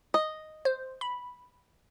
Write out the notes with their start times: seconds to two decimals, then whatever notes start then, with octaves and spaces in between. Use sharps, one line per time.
0.14 D#5
0.65 C5
1.01 B5